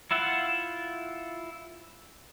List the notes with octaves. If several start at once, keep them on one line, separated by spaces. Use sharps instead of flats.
E4 F4 E5 F#5